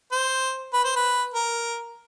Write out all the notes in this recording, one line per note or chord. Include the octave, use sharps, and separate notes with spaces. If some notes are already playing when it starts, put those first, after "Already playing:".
C5
B4
C5
B4
A#4